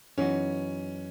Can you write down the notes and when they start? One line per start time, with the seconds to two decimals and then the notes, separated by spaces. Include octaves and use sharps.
0.18 F#2 E3 B3 C#4 D#4 F#4